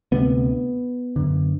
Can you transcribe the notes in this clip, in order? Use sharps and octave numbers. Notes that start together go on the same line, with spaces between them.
D2 C3 B3
F#2 D3